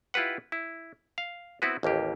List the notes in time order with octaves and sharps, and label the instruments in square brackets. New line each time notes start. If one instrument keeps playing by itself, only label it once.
[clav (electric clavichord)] E4 F4 G4 B4 F#5
E4
F5
B3 C4 E4 F#4 B4
A1 D#2 A#3 G4 G#4